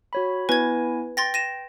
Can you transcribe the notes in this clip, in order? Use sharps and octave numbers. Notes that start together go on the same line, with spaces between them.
F#4 C#5 B5
B3 E4 B4 G#5 G#6
G5 C6 A6 A#6
A#6 D#7 E7